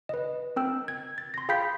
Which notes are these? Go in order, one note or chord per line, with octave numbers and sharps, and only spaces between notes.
B4 D#5
C4 A#4 G5 E6
G#6
A6
C6 A#6
G#4 F5 G5 B5 G6 B6